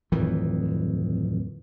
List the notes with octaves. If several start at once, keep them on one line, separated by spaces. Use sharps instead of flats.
D1 F2 D#3 E3